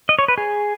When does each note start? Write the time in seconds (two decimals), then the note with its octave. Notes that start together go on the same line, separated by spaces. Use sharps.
0.09 D#5
0.19 C#5
0.28 B4
0.38 G#4